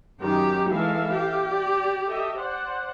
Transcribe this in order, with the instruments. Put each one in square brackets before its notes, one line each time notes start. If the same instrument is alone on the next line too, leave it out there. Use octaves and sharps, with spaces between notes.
[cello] F#2 G4 [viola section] D#3
[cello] E3 G#3 [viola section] A4 E5 F5
[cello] G4
[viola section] D5
A4 D#5 E5
C5 D5 F#5